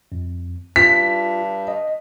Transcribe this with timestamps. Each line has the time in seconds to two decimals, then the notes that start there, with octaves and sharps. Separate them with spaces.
0.12 F2
0.76 G2 F4 B6
1.68 D#5